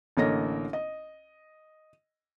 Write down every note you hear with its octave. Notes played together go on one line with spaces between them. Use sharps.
A1 D3 A#3 C#5 D#5 A#6
D#5